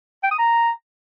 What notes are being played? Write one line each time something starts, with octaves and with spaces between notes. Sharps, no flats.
G5
D#6
A#5